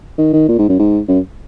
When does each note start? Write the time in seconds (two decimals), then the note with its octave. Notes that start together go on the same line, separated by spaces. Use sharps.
0.18 D#3
0.33 D#3
0.49 A#2
0.58 G#2
0.69 F#2
0.79 G#2
1.08 F#2